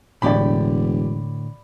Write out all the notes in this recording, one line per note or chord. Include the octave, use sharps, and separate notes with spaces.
E1 A2 D3 G4 D5 B5